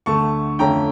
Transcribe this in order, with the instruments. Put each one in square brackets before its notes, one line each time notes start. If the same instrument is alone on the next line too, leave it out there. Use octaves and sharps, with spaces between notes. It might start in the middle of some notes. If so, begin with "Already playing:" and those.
[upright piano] D2 D3 A3 A5 C#6
F2 D3 A3 C#4 G5 A#5